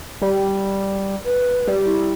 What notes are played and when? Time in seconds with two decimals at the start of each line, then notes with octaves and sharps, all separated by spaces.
0.22 G3
1.25 B4
1.67 G3
1.85 E4